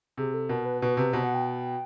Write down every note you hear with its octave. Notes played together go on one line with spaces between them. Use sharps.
C3 G#4
A4
B2 A#4
B4
B2 B4
C3 B4
B2 C5
F#5
G5